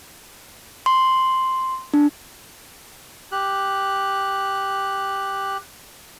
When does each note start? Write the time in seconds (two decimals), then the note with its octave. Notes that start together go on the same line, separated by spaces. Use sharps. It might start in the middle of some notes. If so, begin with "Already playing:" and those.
0.86 C6
1.94 D4
3.32 G4 F#6